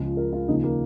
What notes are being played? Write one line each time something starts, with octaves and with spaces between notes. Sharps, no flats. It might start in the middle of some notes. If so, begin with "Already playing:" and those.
Already playing: C#2 C#3 F3
A#4
F4
D#2 C#3 F3 D#4
A#3